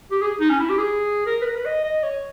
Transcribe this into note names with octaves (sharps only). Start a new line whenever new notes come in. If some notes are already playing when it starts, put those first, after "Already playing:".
G4
G#4
D#4
C#4
E4
G4
G#4
A#4
B4
A#4
B4
D#5
D#5
C#5